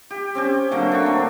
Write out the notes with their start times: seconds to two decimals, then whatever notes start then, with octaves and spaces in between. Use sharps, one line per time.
0.11 G4
0.35 C4 C#4 G4
0.71 D3 F#3 A3 A#3
0.92 D4 C#6
1.06 C4